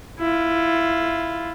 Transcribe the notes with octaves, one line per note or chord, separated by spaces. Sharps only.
E4 F4